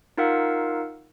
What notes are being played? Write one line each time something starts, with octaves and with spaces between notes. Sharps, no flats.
D#4 F4 A#4 F5 F#5 E6